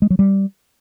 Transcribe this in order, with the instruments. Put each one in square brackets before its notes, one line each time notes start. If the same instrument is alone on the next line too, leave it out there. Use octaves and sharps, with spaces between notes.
[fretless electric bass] G#3
F#3
G3